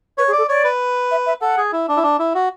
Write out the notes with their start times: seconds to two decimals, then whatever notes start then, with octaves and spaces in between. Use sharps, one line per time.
0.18 B4 C#5
0.28 G#4
0.33 D5
0.38 A4
0.49 C#5 D5
0.64 B4
1.11 E5
1.26 E5
1.41 A4 F#5
1.58 G#4
1.72 E4
1.88 D4
1.97 E4
2.03 D4
2.19 E4
2.35 F#4